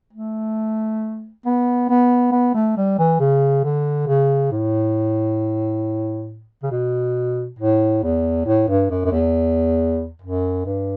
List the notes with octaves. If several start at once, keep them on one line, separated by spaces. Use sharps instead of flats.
A3
B3
B3
B3
A3
G3
E3
C#3
D3
C#3
A2
C#3
B2
A2
E2
A2
G2
F#2
F#2
E2
F#2
G2